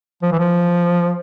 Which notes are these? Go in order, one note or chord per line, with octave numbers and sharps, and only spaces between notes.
F3
E3
F3